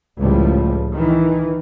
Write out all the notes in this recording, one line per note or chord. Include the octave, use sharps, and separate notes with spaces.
C#2 A2 F3 G3
D#3 E3